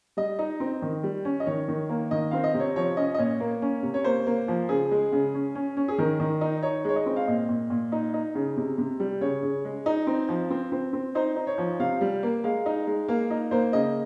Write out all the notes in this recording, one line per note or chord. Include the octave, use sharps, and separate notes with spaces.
G3 D#5
D#4
C4
D#3
G3
C#4
D#5
D#3 C#5
D#3
A#3
D#3 D#5
C4 F5
D#5
C3
C#5
F3 C#5
C#4 D#5
D#5
A#2 C#5
A#3
C#4
C3
C#5
A#3 C5
A#3
F3
C#3 G#4
G#3
C#3
C#4
C#4
C#4
G#4
D#3 A#4
D#3
D#4
D#4 C#5
G#3 C#5
D#5
C4
F5
A#2 D#5
A#2
A#2
D#4
D#4
C#3
C3
C3
G3
C#3 C#5
C#3
G#3
D#4
C4
F3
C4
C4
C4
D#4 C5
D#4
C#5
F3
C3 F5
G3
A#3
G#3 F5
D#4
G#3
A#3 F5
D#4 D#5
A#3 C5
C#3 D#5